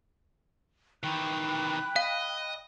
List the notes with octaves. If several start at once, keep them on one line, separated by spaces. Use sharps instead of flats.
D#3 E3 G5 B5 F#6
D#5 F5